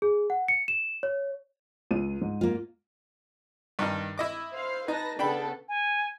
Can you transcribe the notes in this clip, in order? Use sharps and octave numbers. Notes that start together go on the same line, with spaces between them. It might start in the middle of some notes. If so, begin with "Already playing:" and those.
G#4
F#5
C#7
E7
C#5
C#2 F4 D#7
G#2
A#3 F4
G2 D#3 D#4
E4 D#5 D6
C5 F5
D#4 B4 A5 A#6
C#3 B3 D4 A4 G5 B5
G#5